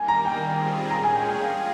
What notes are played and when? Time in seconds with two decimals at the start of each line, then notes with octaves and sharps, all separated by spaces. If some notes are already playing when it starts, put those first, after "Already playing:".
Already playing: D#3 G3 A#3 G#5
0.08 A#5
0.25 G5
0.42 D#3 G3 C4 F4 G#4
0.90 A#2 G#3 C#4 G#4 A#5
1.04 G#5
1.15 G5
1.29 G5
1.40 G3 A#3 F4 G#4 F5